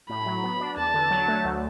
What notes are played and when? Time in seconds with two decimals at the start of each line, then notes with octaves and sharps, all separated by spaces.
0.09 A2 B5
0.26 F#3
0.43 B3
0.60 D4
0.77 E2 A5
0.94 D3
1.11 F#3
1.28 A3
1.44 D2